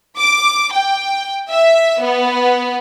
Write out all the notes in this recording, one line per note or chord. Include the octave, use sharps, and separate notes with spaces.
D6
G5
E5
B3